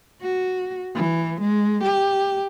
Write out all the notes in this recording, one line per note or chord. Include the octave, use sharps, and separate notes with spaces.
F#4
E3
G#3
G4